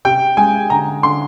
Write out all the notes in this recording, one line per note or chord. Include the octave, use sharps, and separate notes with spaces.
C3 G5
G#3 G#5
D3 A#5
D3 C6